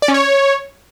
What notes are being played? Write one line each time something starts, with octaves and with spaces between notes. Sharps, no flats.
D5
C#4
C#5